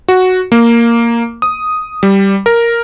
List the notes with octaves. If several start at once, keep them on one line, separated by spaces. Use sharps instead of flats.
F#4
A#3
D#6
G3
A#4